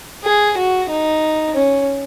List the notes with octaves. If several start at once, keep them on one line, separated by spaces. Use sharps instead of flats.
G#4
F#4
D#4
C#4